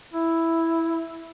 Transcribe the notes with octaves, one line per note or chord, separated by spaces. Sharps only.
E4